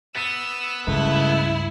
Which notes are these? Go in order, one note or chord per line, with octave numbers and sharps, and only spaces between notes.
B3 E6 A6 B6 D#7
C#2 G2 A3 E4